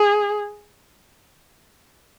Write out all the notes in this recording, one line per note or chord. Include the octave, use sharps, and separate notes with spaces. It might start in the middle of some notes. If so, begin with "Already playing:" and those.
Already playing: G#4